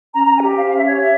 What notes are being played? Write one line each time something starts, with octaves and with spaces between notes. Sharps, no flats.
C#4 A#5
A#5
C#4
G#5
G4
C5 F5
C#4 F5
E5
G4 C#5
C#5 E5